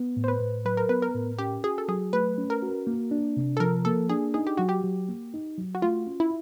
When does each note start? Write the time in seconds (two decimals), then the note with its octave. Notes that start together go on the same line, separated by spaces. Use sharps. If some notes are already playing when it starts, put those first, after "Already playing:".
Already playing: B3
0.17 A2
0.24 C5
0.28 B4
0.41 A2
0.65 F#3 B4
0.77 A#4
0.89 B3 B4
1.02 A#4
1.15 A2
1.39 C#4 G4
1.64 F#4 G#4
1.78 A4
1.89 F#3 G#4
2.13 A3 B4
2.38 C#4
2.50 A#4
2.62 F#4
2.87 A#3
3.11 D4
3.37 C3
3.57 A4
3.60 F3 A#4
3.85 A#3 A4
4.09 D4 G#4
4.34 D#4 G#4
4.47 G4
4.57 F#3 F#4
4.69 G4
4.84 F#3
5.08 A#3
5.34 D#4
5.58 F#3
5.75 F#4
5.82 A3 F4
6.06 C#4
6.20 E4